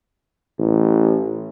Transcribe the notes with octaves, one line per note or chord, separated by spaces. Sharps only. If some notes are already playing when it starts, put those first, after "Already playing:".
A1